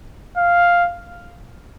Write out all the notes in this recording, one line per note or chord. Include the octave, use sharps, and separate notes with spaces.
F5